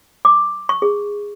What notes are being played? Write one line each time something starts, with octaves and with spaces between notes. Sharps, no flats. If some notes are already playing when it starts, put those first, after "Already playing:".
D6
C#6
G#4